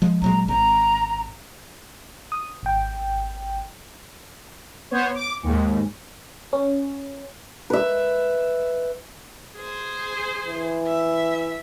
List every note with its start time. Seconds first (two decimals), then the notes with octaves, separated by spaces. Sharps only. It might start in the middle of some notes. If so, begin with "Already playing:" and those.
0.02 F3 G#3
0.22 A#1 F#3 G#3 A#5
0.48 G#1 A#5
2.32 D#6
2.63 G#1 G5
4.91 B3 C5 C#5
5.15 D6
5.43 D#2 G#2 G#3
6.53 C#4
7.70 B4 E5
9.57 G#4 C5
10.46 E3
10.87 E5